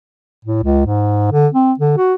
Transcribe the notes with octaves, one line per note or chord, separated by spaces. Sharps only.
A2
C#2
G#2
D3
C4
D3
F#4